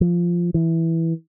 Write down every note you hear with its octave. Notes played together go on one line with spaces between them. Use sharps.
F3
E3